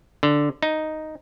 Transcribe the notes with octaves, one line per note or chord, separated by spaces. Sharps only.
D3
D#4